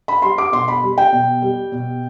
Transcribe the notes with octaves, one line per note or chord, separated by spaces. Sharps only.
B5
G3 C6
D6
B2 C6
B5
G3
G5
B2
G3
B2